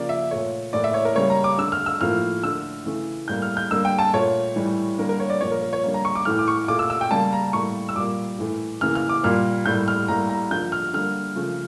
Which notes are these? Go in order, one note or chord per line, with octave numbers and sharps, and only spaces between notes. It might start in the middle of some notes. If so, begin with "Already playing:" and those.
Already playing: C#3 F3 A#3 D5
E5
A#2 A3 C#5
A2 E3 A#3 D5
E5
C#5
A#4
C#3 G3 A#3 C#5
A#5
D6
D3 A3 E6
F6
E6
A2 F3 A#3 F6
D3 A3 E6
C#3 E3 A3
A2 G3 A#3 G6
F6
G6
D3 G3 A#3 E6
G5
A5
A#2 A3 C#5
A2 E3 G3
D3 G3 A#3 A#4
A#4
C#5
D5
A#2 F3 A#3 C#5
A#4
A#4
C#5
D3 G3 A#3
A#5
C#6
D6
A2 E3 A3 F6
D6
C#6
A#2 A3 D6
E6
E6
G5
C#3 G3 A#3 A5
A#5
A2 G3 A#3 C#6
E6
A#2 G3 A#3 D6
A2 E3 A3
C#3 E3 A#3 F6
F6
D6
A#2 G3 A#3 F6
A2 G3 A#3 G6
F6
A2 G3 A#3 A#5
A#5
D3 F3 A#3 G6
F6
D3 G3 A#3 F6
C#3 F3 A3